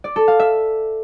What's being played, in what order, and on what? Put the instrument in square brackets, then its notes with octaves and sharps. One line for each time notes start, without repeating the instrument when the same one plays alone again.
[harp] D5
A4
F5
E5